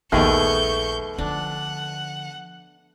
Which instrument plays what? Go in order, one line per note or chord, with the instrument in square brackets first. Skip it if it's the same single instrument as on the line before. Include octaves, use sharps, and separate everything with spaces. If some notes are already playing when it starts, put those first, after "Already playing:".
[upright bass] A#1 [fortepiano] D#2 [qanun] A3 B3 G#4 [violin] C#6 G6
[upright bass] D3 F3 [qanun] D4 [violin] F#5